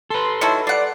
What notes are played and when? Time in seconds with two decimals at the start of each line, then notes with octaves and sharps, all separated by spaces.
0.10 A4 B4 C6
0.41 D#3 F#3 E4 A5 C#7
0.67 G3 D5 F#5 C7